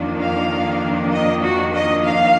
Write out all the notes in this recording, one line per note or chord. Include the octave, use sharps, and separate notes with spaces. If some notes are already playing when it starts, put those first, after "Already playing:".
Already playing: F2 D#3 A#3 D4
F5
D#5
F#4
D#5
F5